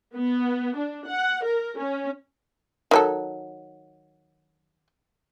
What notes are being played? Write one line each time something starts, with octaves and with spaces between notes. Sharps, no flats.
B3
D4
F#5
A#4
C#4
D#3 F#3 A4